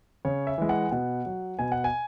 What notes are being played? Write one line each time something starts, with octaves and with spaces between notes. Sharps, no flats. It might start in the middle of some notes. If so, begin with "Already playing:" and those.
C#3 C#5
E5
E3 G#3
F#5
B2 F#5
F#3
B2 G#5
F#5
G#5